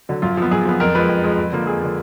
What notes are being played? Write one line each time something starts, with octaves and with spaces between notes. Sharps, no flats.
D3 F#3
F#2 F4
F3 B3
F#2 G#4
F3 B3
F2 A#4
F3 G#3 B4
F2
F3 G#3
F2
D3 F3 A#3
F2 G#4
D3 F3 A#3